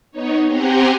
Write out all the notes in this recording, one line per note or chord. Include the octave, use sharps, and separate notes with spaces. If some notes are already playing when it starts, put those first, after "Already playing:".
B3 D#4 C#5
C4 G4 F#5 G#5 A#5 C6